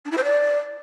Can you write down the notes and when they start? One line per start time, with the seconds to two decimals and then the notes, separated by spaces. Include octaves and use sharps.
0.05 D4
0.11 E4
0.17 C5
0.24 D5